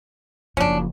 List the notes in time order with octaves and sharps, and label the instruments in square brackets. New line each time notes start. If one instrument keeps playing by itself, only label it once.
[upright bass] F#1 F3 [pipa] C#4 D4